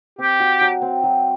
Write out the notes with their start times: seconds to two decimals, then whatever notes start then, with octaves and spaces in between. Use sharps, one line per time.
0.19 C4 G4
0.40 F#4
0.61 F#3
0.82 C4
1.04 F#3